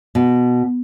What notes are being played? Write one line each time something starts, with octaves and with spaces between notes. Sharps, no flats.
B2